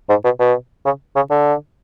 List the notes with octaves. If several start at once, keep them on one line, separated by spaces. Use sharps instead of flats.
G#2
B2
B2
C#3
C#3
D3